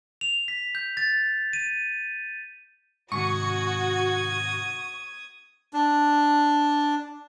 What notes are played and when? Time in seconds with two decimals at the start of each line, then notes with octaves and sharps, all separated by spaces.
0.21 F7
0.48 B6
0.75 G6
0.97 A6
1.53 D#7
3.12 G#2 C3 D#3 F#4 C#6 D#6 G#6
5.73 D4